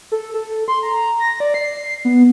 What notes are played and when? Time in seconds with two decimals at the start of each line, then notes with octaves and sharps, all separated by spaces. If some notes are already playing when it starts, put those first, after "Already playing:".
0.12 A4
0.34 A4
0.68 C6
0.83 A#5
1.20 A#6
1.40 D5
1.54 C7
2.05 B3